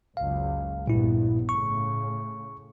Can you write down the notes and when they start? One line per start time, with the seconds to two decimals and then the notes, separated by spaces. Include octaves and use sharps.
0.17 F#1 C#2 F5
0.88 A#1 G2 A#2 B3 E4
1.49 A2 C#3 C#6